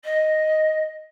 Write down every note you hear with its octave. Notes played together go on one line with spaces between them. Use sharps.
D#5